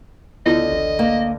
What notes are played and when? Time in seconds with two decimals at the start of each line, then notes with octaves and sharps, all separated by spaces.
0.46 D2 D3 B3 E4 F4 D#5
0.72 A1
0.99 A#3